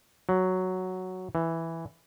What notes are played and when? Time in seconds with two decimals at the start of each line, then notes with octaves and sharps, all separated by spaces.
0.29 F#3
1.35 E3